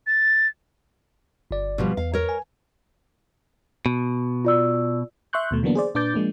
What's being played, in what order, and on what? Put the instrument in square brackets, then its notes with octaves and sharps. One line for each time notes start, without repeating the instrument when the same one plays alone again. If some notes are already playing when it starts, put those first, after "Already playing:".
[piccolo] A6
[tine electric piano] G1 D5
[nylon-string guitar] B2 F3 G3
[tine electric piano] E2 [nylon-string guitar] F5
[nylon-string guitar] A#4 C#5
[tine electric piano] G#5
[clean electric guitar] B2
[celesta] F4 D5 E6
[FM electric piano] E5 C6 C#6 F#6 G6
D#2 B2 A3
D3 E3 F#3 A#3 B3 D4
G#4 C5 D5
A#2 D4 B4 D6 G6 A6
F3 G#3 A#3 D4